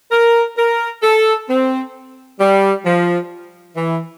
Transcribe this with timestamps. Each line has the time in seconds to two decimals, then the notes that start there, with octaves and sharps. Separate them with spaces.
0.11 A#4
0.57 A#4
1.03 A4
1.49 C4
2.40 G3
2.85 F3
3.76 E3